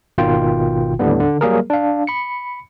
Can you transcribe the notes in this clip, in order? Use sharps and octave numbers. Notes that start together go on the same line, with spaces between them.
G#1 B2 D#3 F4 G5
D#2 A2 D3 G3 B3
D3
F#3 G3 A#3 G#4 A#4
D4 F5
B5 C#7